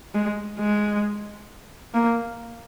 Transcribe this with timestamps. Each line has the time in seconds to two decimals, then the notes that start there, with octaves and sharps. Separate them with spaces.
0.14 G#3
0.59 G#3
1.94 A#3